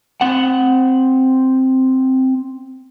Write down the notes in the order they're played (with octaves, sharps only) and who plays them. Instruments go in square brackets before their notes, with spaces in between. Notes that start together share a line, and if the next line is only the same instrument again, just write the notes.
[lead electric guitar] C4 F#5